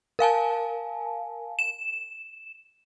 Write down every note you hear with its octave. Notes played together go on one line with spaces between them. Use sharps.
A#4 F5 G#5 A5
E7